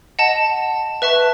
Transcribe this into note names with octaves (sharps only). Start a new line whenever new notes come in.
D#5 F#5 A5
B4 E5 A5 C#6